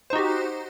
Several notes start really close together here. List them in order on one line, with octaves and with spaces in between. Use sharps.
C5 D#4 F#4 G4